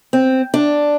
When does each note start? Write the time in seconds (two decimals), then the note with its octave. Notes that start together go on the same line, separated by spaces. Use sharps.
0.13 C4
0.54 D4